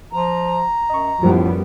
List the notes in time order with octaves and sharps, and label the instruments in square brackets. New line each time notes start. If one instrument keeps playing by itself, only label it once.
[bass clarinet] F3 [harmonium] A#5
[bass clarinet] F#2 [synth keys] D#5 C#6
[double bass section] F#2 G3 B3 [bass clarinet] A2 [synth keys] F3 F4 C5